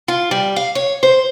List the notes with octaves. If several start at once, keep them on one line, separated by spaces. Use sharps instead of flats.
F4
G3
F5
C#5
C5